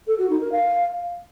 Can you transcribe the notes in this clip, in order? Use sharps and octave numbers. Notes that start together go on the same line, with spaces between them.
A4
F#4
D#4
A#4
F5